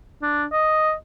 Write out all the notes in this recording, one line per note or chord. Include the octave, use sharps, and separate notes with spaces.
D4
D#5